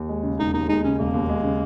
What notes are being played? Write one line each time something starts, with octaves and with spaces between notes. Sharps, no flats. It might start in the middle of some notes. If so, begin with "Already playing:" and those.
Already playing: D#2
G#3
C#3
E1 D#4
D#2 D#4
G#3 D#4
C#3 C#4
E1 A#3
D#2
G#3
C#3